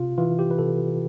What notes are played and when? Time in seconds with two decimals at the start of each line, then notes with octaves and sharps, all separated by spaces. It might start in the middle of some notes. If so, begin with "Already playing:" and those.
Already playing: C3 F4
0.18 E3 F4
0.39 G4
0.51 B4
0.59 C3 A4